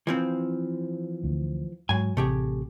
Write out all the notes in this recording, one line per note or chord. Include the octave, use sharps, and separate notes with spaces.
E3 F3 C4
D2
G#2 F#3 G#5
A1 C3 A3 G4 G#4